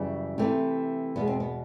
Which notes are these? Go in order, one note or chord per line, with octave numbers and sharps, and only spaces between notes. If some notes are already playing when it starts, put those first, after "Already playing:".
Already playing: F#2 C#3 E3 G3
C3 E3 A3
E2 B2 G#3 B3
C4
B3